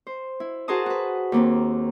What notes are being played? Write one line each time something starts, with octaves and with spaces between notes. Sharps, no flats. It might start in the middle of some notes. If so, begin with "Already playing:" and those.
C5
E4
F#4 G#4 A#4 C5 A5 D#6
F#4 B4
D#2 A#3 C4